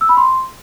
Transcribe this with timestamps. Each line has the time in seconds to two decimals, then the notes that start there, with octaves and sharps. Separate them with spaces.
0.01 E6
0.09 B5
0.17 C6